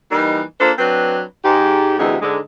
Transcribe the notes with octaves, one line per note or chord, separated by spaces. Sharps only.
E3 G3 A#3 D#4
A#3 D4 F4 A4 C5
F#3 C4 D4 B4
G#2 G4
D2 C3 E3 D#4 F#4 G#4
G#2 D3 G#3